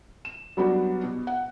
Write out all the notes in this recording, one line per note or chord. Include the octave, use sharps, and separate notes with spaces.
E7
F#3 G3 B3 D4 F#4 G4
B2
F#5